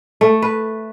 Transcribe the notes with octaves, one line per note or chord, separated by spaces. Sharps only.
A3
B4